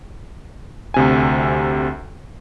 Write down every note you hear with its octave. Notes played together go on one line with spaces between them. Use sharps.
D2 C3 G#5